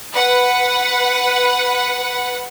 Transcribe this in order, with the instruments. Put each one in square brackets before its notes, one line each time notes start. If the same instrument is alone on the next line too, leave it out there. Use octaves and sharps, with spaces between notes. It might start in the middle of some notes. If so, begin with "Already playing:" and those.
[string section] B4 F#5